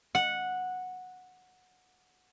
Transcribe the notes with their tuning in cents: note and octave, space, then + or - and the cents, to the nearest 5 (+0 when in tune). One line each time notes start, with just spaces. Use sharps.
F#5 -10